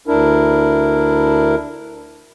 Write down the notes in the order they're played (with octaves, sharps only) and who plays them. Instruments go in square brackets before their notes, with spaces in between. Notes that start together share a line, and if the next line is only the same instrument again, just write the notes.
[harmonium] D2 D4 E4 A#4